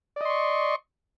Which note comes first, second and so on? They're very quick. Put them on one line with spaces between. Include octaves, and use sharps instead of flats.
D5 D#5 C6 C#6